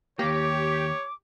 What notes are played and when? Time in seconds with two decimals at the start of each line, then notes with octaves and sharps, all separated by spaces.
0.19 D#2 A#3 G4 C#5 D6